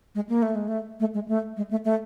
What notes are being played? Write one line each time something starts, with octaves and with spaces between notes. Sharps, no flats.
G#3
A#3
A3
G#3
A3
A3
G#3
A3
G#3
A3
A3